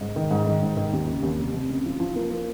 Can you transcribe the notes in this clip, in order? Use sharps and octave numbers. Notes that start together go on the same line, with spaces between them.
G#2
D#3
G#2
D#3
G#2
D#3
D#2
C#3
D#2
F1
F1
C#3
F3
F3
A#3
A#3